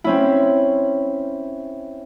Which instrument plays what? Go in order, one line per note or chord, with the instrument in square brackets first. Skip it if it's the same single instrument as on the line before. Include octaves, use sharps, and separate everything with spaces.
[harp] C4 C#4 E4